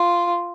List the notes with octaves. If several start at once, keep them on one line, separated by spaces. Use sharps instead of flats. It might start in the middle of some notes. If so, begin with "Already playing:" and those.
Already playing: F4